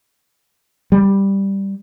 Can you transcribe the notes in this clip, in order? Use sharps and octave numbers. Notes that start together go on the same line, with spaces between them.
G3